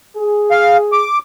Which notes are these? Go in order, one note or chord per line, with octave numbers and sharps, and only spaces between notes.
G#4
F5
D6